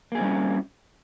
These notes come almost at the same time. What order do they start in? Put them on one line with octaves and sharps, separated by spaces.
A#3 G#4 C4 G3 C#4